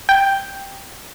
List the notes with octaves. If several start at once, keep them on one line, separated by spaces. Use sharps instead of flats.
G5